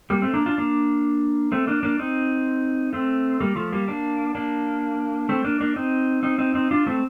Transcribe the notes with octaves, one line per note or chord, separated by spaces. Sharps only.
G3 A#3
A3 C4
A#3 D4
D4 F4
A#3 D4
A3 C4
A#3 D4
A#3 D4
C4 D#4
A3 C4
G3 A#3
F3 A3
G3 A#3
A#3 D4
A#3 D4
A3 C4
A#3 D4
A#3 D4
C4 D#4
C4 D#4
C4 D#4
C4 D#4
D4 F4
A3 C4